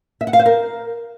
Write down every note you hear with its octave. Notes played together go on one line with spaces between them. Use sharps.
E5
F#5
F5
C5
A#4